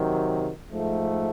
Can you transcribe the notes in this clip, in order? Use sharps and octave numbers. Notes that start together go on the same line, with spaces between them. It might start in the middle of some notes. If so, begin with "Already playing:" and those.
Already playing: C3 D#3 F#3
G#2 F3 A3